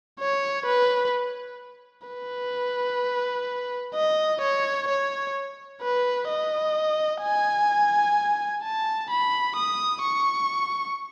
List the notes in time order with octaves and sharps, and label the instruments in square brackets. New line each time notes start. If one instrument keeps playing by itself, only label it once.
[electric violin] C#5
B4
B4
D#5
C#5
C#5
B4
D#5
G#5
A5
B5
D#6
C#6